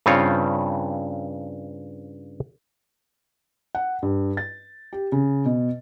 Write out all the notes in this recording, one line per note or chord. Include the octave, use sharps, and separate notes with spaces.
G2 C#3 C4 F4 C#5
F#5
G2
A6
G4
C#3
B2